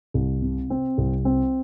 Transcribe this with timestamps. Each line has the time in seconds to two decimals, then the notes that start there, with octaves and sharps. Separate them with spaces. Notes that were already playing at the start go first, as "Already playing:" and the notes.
0.14 C2
0.42 C3
0.70 C4
0.98 C2
1.25 C4